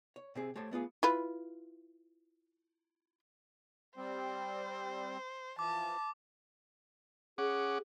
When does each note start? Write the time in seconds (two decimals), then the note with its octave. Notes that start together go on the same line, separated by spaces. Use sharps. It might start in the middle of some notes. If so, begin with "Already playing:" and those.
0.16 C#5
0.36 C3 C4 G#4
0.56 A3 G4 C5 C#5 A5
0.71 A3 B3 F4 G#4
1.03 E4 F4 B4
3.97 G3 C4 C5
5.59 E3 F3 A5 D6
7.38 C#4 G#4 F#5 D6